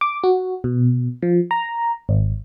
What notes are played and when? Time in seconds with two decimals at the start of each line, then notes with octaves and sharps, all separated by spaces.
0.01 D6
0.24 F#4
0.64 B2
1.22 F3
1.51 A#5
2.09 G#1